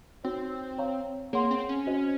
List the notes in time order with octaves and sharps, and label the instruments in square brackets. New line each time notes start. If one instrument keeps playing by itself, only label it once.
[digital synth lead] C4 [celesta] D#4 F#4 C#5
[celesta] C#5 F5 A#5 C#6
[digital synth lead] A#3 [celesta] G#4 C#5 F#5 C6
[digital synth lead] C4
C#4
[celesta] F#4 C5 D#5